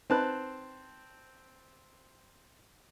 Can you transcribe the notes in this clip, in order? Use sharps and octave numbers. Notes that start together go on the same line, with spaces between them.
C4 D#4 B4 A5 F#6